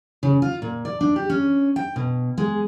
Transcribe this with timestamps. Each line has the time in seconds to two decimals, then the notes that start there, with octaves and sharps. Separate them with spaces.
0.23 C#3
0.42 F4
0.62 A#2
0.85 D5
1.01 D4
1.16 G4
1.30 C#4
1.76 G5
1.96 B2
2.38 G#3